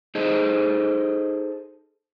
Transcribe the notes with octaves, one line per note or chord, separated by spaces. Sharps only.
D#4 G#4 A4 C5 D#5